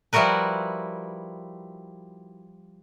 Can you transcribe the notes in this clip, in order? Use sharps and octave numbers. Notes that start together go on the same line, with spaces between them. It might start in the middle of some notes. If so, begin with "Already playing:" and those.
F3 G3 E4 F#4 A#4 B4